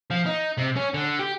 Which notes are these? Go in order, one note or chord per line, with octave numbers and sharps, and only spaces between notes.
F3
D#4
C3
C#4
D3
G4